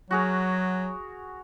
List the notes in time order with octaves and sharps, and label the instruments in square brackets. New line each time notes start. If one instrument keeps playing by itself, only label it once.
[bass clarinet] F#3 [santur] F#4 G#4 A#4